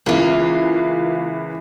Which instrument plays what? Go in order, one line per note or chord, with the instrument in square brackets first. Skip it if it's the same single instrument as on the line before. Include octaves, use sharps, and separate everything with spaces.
[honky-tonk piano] C#2 E3 [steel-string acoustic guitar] A#3 F4